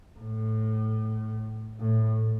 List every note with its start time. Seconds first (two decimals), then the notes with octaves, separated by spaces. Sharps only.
0.20 A2
1.80 A2